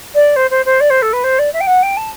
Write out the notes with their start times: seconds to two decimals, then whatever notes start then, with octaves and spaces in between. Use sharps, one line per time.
0.15 D5
0.36 C5
0.51 C5
0.66 C5
0.80 D5
0.90 C5
1.02 A4
1.13 B4
1.24 C5
1.39 D5
1.53 E5
1.60 G5
1.67 F#5
1.82 G5
1.97 A5